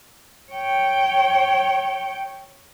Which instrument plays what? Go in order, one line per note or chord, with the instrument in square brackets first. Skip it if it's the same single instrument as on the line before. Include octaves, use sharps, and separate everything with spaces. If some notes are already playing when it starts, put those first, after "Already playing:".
[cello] C#5 G5